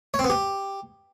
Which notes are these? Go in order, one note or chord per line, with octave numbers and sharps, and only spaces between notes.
C#5
C4
B3
G4